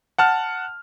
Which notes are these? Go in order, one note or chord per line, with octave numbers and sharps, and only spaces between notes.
F#5 A5 F6